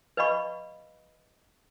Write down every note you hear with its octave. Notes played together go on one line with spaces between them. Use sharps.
B4 D5 D#5 F5 B5 C#6